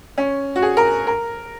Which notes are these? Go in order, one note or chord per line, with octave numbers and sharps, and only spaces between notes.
C#4
F#4
G#4
A#4
A#4